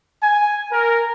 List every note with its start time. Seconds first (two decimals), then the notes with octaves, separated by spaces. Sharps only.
0.22 G#5
0.71 A#4